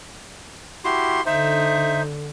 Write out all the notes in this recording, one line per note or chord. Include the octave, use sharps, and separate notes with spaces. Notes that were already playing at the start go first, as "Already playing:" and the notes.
E4 F#4 G4 C6
D3 D#4 C5 E5